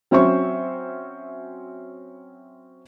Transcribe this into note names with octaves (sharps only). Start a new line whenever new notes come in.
F#3 C4 C#4 C5 E5 C#6